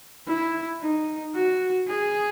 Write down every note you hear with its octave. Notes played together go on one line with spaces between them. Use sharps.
E4
D#4
F#4
G#4